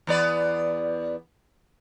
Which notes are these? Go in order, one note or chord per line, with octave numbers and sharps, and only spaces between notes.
E2 B3 D5